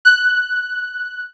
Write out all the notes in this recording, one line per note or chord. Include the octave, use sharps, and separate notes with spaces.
F#6